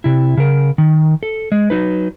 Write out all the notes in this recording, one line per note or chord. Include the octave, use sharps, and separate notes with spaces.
C3 E4
C#3 A#4
D#3
A4
G#3
F#3 D#4 B4